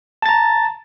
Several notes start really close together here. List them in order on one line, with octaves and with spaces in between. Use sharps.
A5 A6 A#5